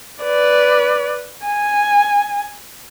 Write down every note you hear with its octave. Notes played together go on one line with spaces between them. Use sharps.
B4 D5
G#5